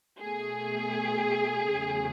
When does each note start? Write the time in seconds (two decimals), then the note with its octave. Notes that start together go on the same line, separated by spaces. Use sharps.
0.20 B2 A3 G#4
1.72 E2 C#3 F#3 A3